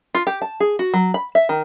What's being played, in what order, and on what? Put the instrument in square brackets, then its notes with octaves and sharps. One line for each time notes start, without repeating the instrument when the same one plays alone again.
[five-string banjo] F4
G4
A5
G#4
F#4
F#3
B5
E5
D#3